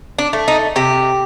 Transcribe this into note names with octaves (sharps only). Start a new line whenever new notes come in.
D4
A3
D#4
C3 G4